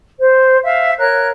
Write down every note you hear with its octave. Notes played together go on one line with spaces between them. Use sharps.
C5
E5 F5
A#4 C#5 F#6